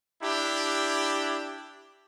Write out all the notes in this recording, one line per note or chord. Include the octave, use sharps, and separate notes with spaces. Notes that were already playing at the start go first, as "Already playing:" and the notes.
D4 E4 G4